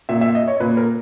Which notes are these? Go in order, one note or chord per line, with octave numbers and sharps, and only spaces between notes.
A#2 E5
E5
D#5
C#5
A#2 B4
A#4